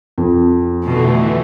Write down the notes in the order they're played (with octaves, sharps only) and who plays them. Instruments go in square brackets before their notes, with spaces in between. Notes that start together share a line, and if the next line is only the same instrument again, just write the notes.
[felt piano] F2
[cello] B2 D3 [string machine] E3 A3